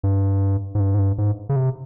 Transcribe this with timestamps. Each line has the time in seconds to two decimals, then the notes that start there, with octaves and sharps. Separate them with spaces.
0.03 G2
0.75 G#2
0.80 G2
0.94 G#2
0.99 G2
1.18 G#2
1.49 C#3
1.56 C3